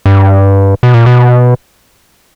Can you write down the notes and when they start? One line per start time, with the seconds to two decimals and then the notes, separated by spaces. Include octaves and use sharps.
0.06 G2
0.83 B2
0.94 A#2
1.06 B2